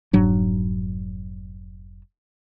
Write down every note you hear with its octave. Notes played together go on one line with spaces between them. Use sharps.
F1 G#2 F#3 D4